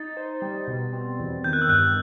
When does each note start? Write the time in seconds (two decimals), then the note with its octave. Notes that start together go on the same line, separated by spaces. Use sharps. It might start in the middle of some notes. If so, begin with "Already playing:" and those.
Already playing: D#4 A6
0.17 C5
0.42 G3
0.68 B2
0.93 C4
1.19 E2
1.44 D#3 G6
1.53 F#6
1.62 E6
1.69 G2 F#6